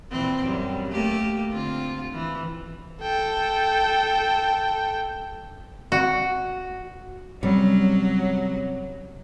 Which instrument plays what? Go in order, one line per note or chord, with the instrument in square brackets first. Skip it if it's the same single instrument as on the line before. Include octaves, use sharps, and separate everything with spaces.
[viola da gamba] A#2 E3 C4
F#2 G3
A3 A#3 G4
D3 C4 F4
E3
[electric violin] A4 G5
[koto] F#4
[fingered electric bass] C3 C#4 [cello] F#3 [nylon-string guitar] G3